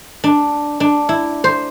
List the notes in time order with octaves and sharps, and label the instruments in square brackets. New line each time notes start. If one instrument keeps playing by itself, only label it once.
[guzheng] D4
D4
E4
C5